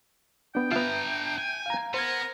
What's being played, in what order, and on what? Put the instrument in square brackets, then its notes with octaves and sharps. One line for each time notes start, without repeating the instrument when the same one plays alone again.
[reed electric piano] B3 D4 [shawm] G5
[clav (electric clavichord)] B3 F4 [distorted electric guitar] D4 A#5 [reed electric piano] E5
[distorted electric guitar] G#5
[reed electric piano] F5 A#5
[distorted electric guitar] B3 [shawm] A#4 [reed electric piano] C5 G#6